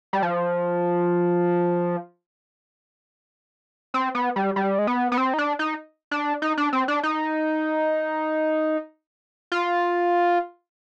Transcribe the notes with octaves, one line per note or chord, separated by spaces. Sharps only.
G3
F3
C4
B3
G3
G3
G#3
B3
B3
C4
D#4
D4
D#4
D4
D#4
D4
C4
D4
D#4
F4